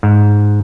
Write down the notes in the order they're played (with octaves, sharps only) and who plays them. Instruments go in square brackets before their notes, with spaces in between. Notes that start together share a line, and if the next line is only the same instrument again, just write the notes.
[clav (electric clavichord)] G#2